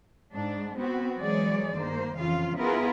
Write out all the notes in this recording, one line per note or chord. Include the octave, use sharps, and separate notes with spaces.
G#2 D4
B3 C4 F#4
E3 F#3 G#3 G#4 C#5 D5
G2 D#3 A#3 C5
F2 C#3 E3 F4 F5
B3 E4 F4 G#4 A#4 B4